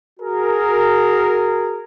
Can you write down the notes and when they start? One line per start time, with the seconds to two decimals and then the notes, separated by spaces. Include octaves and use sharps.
0.20 F#4 G#4 A#4